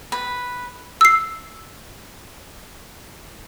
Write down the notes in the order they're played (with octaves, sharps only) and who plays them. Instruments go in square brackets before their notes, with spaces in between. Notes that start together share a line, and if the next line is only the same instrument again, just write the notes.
[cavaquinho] B4
[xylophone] E6 C7